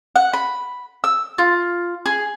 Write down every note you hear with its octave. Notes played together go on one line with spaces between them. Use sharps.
F#5
B5
E6
F4
G#4